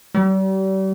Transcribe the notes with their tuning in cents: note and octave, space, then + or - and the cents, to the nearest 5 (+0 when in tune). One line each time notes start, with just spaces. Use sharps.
G3 -40